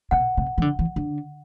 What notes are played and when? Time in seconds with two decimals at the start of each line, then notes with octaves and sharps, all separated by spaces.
0.11 B2 F#5
0.37 C3
0.58 E3
0.62 D3
0.79 E3
0.96 D3